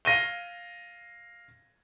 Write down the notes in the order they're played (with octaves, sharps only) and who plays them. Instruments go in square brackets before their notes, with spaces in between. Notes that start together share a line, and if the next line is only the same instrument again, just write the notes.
[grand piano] F5 A#6 D#7 G7